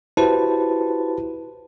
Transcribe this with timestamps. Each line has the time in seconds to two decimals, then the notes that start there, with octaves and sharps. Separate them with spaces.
0.17 E4 F#4 G4 B4 C5 A5